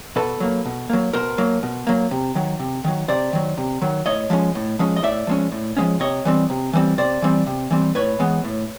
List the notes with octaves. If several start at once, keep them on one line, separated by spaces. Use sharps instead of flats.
B2 A4 B4
F#3 A#3
B2
F#3 A#3
B2 A#4 C5
F#3 A#3
B2
F#3 A#3
C3
D#3 F#3
C3
D#3 F#3
C3 C5 D5
D#3 F#3
C3
D#3 F#3
A2 C#5 D#5
F3 G#3 C#4
A2
F3 G#3 C#4
D#5
A2 D5 E5
F3 G#3 C#4
A2
F3 G#3 C#4
C3 C#5 D#5
E3 G3 C4
C3
E3 G3 C4
C3 C5 D5
E3 G3 C4
C3
E3 G3 C4
A2 B4 C#5
E3 G#3 B3
A2